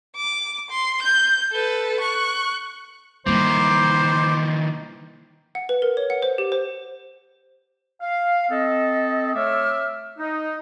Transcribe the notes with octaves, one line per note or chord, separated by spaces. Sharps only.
D6
C6
G6
A4 B4
C#6 F#6
D#3 E3 G3 A#3 C5 D6
F#5
B4
A#4
C#5
F#5
C5
G4
C5
F5
C4 A4 D#5
A3 C#5 E5 D6 E6 F6
D#4